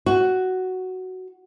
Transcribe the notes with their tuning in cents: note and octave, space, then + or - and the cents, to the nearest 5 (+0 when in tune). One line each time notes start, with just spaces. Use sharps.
F#4 +5